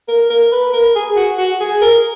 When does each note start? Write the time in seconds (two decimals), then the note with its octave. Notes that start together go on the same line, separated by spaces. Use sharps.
0.08 A#4
0.30 A#4
0.52 B4
0.73 A#4
0.96 G#4
1.16 F#4
1.38 F#4
1.60 G#4
1.81 A#4